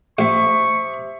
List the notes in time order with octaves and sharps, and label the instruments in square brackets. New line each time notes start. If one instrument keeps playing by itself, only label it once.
[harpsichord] A1 [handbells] G4 C5 E5 [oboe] C#6